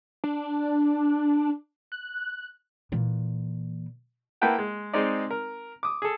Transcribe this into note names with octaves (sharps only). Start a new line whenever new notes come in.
D4
F#6
A#2 E3
A#3 E4 B4 F#5 G5 A5
G#3
G#3 C4 D#4 D5
A#4
D6 D#6
G#4 A4